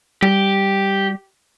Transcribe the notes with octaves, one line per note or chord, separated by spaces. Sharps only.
G3 G4